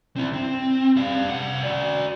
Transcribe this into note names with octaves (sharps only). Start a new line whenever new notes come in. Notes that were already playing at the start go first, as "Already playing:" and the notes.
C4 E4
C4
G3 F5
C2 F#5
F#4 D5